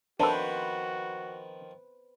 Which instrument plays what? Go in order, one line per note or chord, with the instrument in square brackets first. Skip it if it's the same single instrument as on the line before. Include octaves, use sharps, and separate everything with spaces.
[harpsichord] D#3 F3 [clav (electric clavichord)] D4 A4 [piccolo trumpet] F#4 [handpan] B4 C5